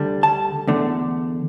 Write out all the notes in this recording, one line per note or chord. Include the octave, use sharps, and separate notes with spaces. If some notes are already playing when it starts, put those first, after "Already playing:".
Already playing: D2 D3 G3 D4
A5
E2 D3 A3